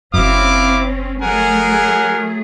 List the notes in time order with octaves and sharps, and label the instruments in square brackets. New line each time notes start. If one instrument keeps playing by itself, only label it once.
[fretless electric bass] F#1 F#2 [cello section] C4 C#4 [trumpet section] E4 F5 D6
[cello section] F#3 A3 G#4 [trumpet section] A#4 F#5 G#5